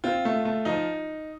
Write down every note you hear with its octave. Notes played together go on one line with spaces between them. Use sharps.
C4 F4
A3
A3
F3 D#4